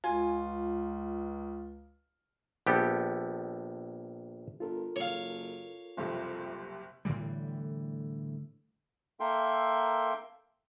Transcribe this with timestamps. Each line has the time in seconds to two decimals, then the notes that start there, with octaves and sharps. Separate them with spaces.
0.04 C#2 F4 G#5
2.67 A#1 B3 G4 A4
4.60 G1 F4 A4 A#4
4.96 F#1 C#5 F5
5.97 F#1 C2 F2 C3
7.05 A2 D3 E3 G3
9.20 A#3 A4 A#4 E5 G5 C6